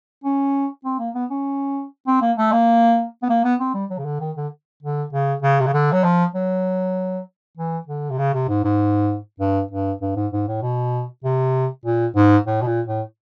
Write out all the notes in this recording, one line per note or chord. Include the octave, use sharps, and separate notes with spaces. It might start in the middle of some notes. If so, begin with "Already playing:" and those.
C#4
C4
A#3
B3
C#4
C4
A#3
A3
A#3
B3
A#3
B3
C4
G3
F#3
C#3
D3
D#3
D3
D3
C#3
C#3
C3
C#3
D3
F#3
F3
F#3
E3
D3
C3
C#3
C3
G#2
G#2
G2
G2
G2
G#2
G#2
A2
B2
C3
A#2
G#2
A2
B2
A#2
A2